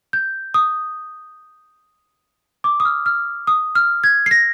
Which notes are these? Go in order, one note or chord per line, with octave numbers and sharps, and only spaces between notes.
G6
D#6
D6
D#6
F6
F6
D#6
F6
G#6
C7
A#6